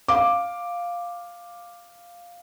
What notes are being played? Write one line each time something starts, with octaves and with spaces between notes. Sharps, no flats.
F5 D6